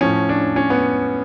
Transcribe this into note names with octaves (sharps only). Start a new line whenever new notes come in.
A2 F3 C#4
D4
C#4
B3